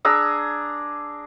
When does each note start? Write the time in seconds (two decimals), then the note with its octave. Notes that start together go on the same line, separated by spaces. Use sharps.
0.05 D4 G#4 A#5 E6